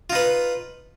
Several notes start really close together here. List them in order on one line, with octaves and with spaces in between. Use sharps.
F4 D#4 B4